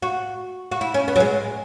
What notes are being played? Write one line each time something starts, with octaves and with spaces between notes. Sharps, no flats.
F#4
F#4
E4
C#4
B3
F#3
G#3